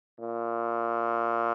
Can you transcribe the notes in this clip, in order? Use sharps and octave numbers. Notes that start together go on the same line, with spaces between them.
A#2